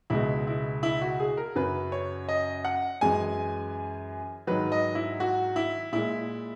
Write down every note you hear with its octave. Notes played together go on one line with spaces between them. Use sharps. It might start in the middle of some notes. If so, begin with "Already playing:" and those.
C#2 B2 G#3 E4
E4
E4
F#4
G#4
A#4
F#2 C#3 F#3 B4
C#5
D#5
F#5
F#2 E3 G#3 G#5
G#2 D#3 F#3 B4
D#5
E4
F#4
E4
A#2 G#3 E4